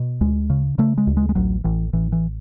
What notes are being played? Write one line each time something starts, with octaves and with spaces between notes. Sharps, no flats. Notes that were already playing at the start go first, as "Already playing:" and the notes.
Already playing: B2
D2 G#3
C#3
C#3 A3
G#3
D2
G#3
G#3
A1 F#3
A1 E3
A1 E3
E3